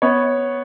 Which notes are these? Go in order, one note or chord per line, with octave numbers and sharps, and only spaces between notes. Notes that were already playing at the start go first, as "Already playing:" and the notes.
B3 C#5